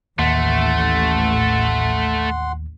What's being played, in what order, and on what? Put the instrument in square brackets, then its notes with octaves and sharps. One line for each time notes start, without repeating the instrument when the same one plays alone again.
[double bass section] A1 [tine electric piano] D#2 [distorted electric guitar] A3 [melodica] F#5 C6